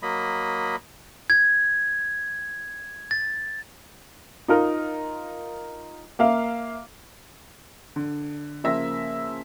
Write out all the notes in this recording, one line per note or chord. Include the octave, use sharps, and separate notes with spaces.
F#3 A#3 D#5 B5
G#6
A6
D#4 F4 A#4
A#3 E5 F5
D3
C#3 F3 A#3 E5 A#6